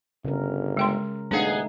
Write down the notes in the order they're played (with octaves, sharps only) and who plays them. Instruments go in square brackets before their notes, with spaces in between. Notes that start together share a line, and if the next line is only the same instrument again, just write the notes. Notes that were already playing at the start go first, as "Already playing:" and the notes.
[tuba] G1 [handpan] C#3 C#4 A#4
[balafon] G#3 G5 C6 [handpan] A#4
[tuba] D#1 [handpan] G#3 A3 D#4 [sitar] B3 G#4 [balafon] D4 F5